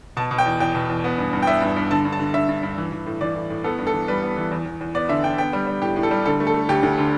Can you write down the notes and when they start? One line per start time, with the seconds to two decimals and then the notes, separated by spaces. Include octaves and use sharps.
0.17 B2 A5
0.31 B2
0.38 G5
0.46 E2
0.60 E2 G5
0.75 B2
0.89 E2
1.04 B3
1.18 G2
1.33 G2
1.43 G5
1.47 B3 E5
1.61 G2
1.77 G2
1.91 D3 A5
2.05 G2
2.12 A5
2.19 D3
2.34 G2 E5
2.49 G2
2.63 G2
2.78 E3
2.92 E3
3.06 A2
3.21 E3 D5
3.35 A2
3.50 A2
3.64 B3 A4
3.79 G2
3.87 A4
3.94 E3
4.08 G3 B4
4.22 B3
4.37 E3
4.51 E2
4.66 E2
4.81 E2
4.95 B3 D5
5.09 D3 E5
5.24 D3 G5
5.38 B3 G5
5.53 G3
5.67 G3
5.82 A2 G4
5.96 A2
6.03 A4
6.11 G3
6.26 D3 A4
6.40 A3
6.47 A4
6.54 A3
6.69 D2 G4
6.83 D2
6.98 D3